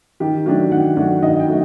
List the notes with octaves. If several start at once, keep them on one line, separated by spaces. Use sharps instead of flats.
D#3 G4
F#3 A3 D4 G4
D#3 F#5
F#3 A3 D4
D#3 D#5
G5
F#3 A3